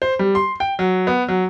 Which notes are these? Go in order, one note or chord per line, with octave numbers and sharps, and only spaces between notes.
C5
G3
C6
G5
F#3
B3
F#3